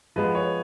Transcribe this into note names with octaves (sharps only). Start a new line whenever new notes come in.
F3 G#3 B3 B4
C#5